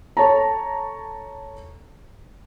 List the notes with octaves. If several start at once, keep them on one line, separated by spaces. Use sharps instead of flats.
A4 C#5 A5 A#5